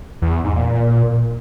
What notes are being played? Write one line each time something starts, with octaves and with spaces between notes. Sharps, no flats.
E2
E2
G#2
A#2